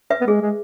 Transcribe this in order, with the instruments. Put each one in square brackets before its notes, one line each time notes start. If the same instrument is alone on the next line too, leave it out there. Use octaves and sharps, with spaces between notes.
[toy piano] B4 E5
[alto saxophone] B3
[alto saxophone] G#3 [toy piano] G#4
[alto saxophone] G#3